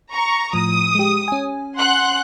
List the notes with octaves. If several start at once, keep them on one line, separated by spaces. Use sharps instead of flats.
A#5 C#6
A2 F3 D#6
G#3 G4
C#4 G#5
F#5 C6 F#6